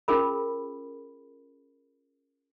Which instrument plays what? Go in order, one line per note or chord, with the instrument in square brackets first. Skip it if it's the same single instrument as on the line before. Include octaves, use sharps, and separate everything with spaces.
[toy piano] C#4 F4 G#4 A#4 B5